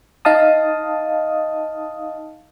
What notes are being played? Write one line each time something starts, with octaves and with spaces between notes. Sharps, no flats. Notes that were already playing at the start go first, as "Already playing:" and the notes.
D#4 D#5 F5 A5 D#6